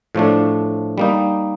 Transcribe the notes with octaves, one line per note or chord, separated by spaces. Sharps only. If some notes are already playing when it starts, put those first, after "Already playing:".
A2 F3 A3 D4
G3 A#3 D#4